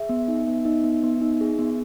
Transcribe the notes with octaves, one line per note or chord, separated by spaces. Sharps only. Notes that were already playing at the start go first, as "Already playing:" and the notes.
Already playing: G#4 E5
B3
D#4
B3
D#4
B3
B3
D#4
G#4
B3